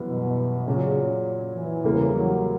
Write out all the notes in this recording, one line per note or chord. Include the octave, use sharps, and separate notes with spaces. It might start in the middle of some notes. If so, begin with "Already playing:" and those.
Already playing: F#2 E3 G3 B3
B2
A#2 C#3 F#3 C#4
E3
E2 C#3 G3 A#3
F#3